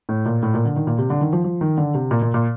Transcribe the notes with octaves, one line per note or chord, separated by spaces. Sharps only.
A2
A#2
A2
A#2
D3
D#3
A#2
C3
D3
D#3
F3
F3
D#3
D3
C3
A#2
A#2
A#2